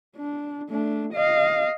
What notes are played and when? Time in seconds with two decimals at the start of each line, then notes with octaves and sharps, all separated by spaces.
0.17 D4
0.70 A3 D4
1.13 D#5 F5